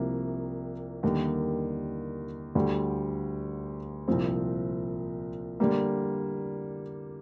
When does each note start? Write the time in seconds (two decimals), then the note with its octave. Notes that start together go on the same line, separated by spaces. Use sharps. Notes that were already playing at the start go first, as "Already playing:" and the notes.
Already playing: C2 C3 F3 A#3
1.03 D#2 D3 G3 A#3
2.55 D2 D3 G3
4.08 C2 A#2 F3 C4
5.60 D3 G3 A#3